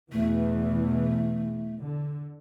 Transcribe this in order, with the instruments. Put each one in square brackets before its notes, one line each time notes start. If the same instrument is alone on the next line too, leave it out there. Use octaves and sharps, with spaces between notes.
[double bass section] E2 B2 E3 [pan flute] A3
[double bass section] D3